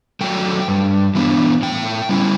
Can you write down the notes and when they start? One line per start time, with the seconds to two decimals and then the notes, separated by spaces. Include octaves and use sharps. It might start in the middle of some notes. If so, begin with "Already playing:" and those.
0.21 F#3 A3 G5
0.68 G2
1.15 E3 B3 D4
1.62 A2 G5
2.09 G3 C#4 E4